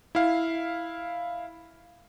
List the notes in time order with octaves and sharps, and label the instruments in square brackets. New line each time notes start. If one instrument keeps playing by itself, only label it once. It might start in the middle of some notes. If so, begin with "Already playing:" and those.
[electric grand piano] E4 F5